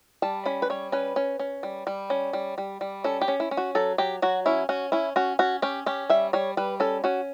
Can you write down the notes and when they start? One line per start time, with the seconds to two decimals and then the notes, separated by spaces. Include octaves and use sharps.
0.22 G3 A5
0.46 C#4 B5
0.62 B4
0.70 G3 C#5
0.92 C#4 B4
1.16 C#4
1.39 C#4
1.63 G3
1.87 G3
2.10 C#4
2.33 G3
2.58 G3
2.81 G3
3.04 C#4 A4
3.21 G4
3.28 C#4
3.40 E4
3.51 C#4
3.57 F#4
3.75 F#3 A4
3.98 F#3 G4
4.22 F#3 F#4
4.46 C#4 E4
4.69 C#4 F#4
4.92 C#4 E4
5.16 C#4 F#4
5.39 C#4 F#4
5.62 C#4 G4
5.86 C#4 G4
6.09 G3 E5
6.33 G3 C#5
6.57 G3 B4
6.80 C#4 A4
7.04 C#4 F#4